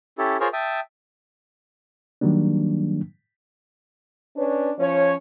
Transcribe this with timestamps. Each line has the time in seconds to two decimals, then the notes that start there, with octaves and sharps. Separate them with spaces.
0.18 C#4 E4 G4 A4
0.40 F4 G#4 A#4 C5 C#5
0.53 E5 G5 A5 D#6
2.21 D#3 F#3 G3 A#3 D4
4.37 C#4 D4 B4 C#5
4.78 F3 C#4 C#5